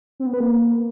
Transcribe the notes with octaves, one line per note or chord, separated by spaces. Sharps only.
C4
B3
B4
A#3